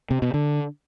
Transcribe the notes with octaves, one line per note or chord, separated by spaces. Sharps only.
C3
B2
D3